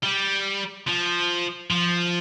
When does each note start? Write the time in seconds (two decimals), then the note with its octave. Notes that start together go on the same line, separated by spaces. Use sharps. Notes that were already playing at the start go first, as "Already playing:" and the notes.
0.03 G3
0.88 F3
1.71 F3